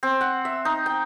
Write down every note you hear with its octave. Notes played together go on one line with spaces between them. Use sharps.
C4
F#5
E5
D#4
G5